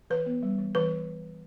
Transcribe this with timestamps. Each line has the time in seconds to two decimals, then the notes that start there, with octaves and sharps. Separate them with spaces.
0.10 E3 B4
0.26 B3
0.43 G3
0.59 E3
0.75 E3 B4